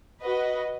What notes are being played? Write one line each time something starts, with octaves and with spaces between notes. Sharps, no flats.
F#4 B4 D#5